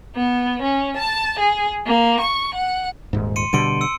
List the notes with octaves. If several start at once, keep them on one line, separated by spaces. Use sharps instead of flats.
B3
C#4
A5
G#4
A#3
C#6
F#5
D#1 G#2
C6 C#7 D#7
B2 D3 G3 C6 D7 D#7
E6 C#7